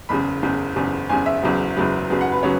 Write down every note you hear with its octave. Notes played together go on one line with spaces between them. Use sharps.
F#1 E2 C#3 B5
F#1 E2 C#3
F#1 E2 C#3
F#1 E2 C#3 G#5
E5
F#1 E2 C#3 F#3 B3
F#1 E2 C#3 F#3 B3
F#1 E2 C#3 F#3 B3
F#5
B4
C#3 F#3 B3 C#5